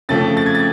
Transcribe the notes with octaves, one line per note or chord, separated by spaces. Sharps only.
F2 C#3 F3 A3 C#4 A6
A6
G#6
A6